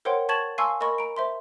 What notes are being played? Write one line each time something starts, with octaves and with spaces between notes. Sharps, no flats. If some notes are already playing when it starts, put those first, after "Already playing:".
A#4 C5 C#5 F#5 G5 C6
A5 C#6 G#6 A6 E7 F#7
F5 G#5 A5 C6 C#6 E6
A#4 D#5 B5 C#6
A#5 D7
C5 E5 C6